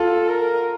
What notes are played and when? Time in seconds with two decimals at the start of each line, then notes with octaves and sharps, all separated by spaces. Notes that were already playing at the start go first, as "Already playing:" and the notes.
Already playing: F4 A4
0.28 A#4